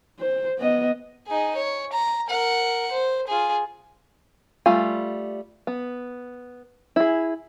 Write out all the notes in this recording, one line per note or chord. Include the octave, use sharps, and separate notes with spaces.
C5
B3 D#5
D#4 G#4
C#5
A#5
A#4 F#5
C5
F4 G#4
G3 A3 F4 G#5
B3
E4 G#4